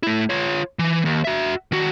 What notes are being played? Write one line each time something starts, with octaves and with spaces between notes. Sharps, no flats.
A3 E4
F4 C#5
E3
D#2
F#4 E5
D#3 F#4